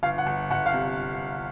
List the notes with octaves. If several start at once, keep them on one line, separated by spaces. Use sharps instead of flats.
G1 F5
F#5
G1
G1 F#5
F5
C3